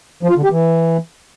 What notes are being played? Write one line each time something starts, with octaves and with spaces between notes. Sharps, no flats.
F3
F4
D3
G4
E3